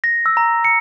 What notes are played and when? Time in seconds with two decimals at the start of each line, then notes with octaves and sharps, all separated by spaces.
0.04 A#6
0.26 E6
0.37 A#5
0.64 C#7